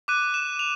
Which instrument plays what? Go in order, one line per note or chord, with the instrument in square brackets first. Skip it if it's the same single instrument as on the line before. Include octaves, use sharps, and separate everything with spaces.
[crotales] D6 F#6 D#7
E7
F7